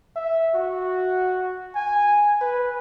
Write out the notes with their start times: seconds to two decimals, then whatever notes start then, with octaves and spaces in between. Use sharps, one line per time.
0.16 E5
0.55 F#4
1.75 G#5
2.41 B4